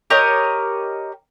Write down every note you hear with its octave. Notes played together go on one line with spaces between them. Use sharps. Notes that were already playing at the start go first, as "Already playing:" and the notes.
G4 A#4 C#5 D#5